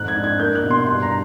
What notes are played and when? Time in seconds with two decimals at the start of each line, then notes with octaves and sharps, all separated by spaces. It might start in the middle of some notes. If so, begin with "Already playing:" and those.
Already playing: F2 G#2 F#6
0.08 G#6
0.16 D4
0.24 G#6
0.40 A#3 G6
0.55 F#6
0.63 B2
0.71 C6
0.86 G2 C6
1.02 A#5